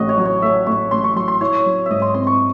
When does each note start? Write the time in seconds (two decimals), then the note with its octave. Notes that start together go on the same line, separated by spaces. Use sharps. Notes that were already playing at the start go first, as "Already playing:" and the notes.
Already playing: A1 A2 F#4 D#5 F#5
0.09 C#5
0.18 F#3
0.26 C#5
0.42 A3 E5
0.67 A2 C#6
0.91 A1 C6
1.04 C#6
1.16 F#3 C6
1.28 C6
1.41 E4 C#5
1.66 F#3
1.86 G#2 D#5 E5
2.02 C6
2.14 C4 C6
2.27 C#6